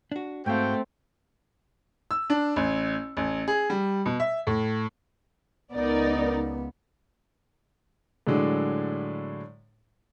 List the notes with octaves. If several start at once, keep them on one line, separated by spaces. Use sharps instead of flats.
D4 F#4
G#2 A3 C4 F#4 F5 G5
E6
D4
A1
A1
G#4
G3
B2
E5
A2
C#2 B3 D#4 A#4 D5
A2 D3 F#3 G#3 D4